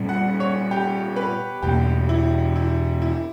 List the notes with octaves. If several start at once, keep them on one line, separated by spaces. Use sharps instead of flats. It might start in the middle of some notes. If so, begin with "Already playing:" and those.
Already playing: A#2 G3 C#4
F#5
C#5
G4
B4
E2 B2 A#3 G4
E4
E4
E4